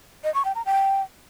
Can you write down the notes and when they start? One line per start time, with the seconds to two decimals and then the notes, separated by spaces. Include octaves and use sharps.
0.24 D#5
0.34 C#6
0.45 G5
0.55 A#5
0.66 G5